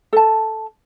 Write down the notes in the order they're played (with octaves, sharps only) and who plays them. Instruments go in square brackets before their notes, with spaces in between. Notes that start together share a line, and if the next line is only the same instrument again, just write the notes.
[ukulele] A4 A5